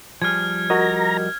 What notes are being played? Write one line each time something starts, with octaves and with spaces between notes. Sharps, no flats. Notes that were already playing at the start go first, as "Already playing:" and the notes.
F3 G3 G#4 F6 G#6
F#4 A#4 D#5 A#5